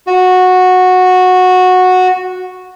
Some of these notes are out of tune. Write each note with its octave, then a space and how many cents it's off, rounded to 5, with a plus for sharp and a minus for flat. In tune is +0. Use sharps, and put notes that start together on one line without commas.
F#4 -10